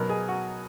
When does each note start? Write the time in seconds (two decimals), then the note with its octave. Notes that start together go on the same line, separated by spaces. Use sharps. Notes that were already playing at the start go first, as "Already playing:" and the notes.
Already playing: B2 F#3 B3 D#4 A#4
0.09 G#4
0.28 F#4